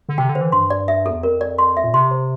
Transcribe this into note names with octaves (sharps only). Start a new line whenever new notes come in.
D3
C3 G5
D3
C5
E3
G2 C6
D5
E5
E2 A4
F2 A#4
D5
C6
E5
A#2
C3 C6
C5